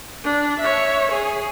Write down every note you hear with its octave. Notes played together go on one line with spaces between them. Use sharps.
D4
C#5 E5
G#4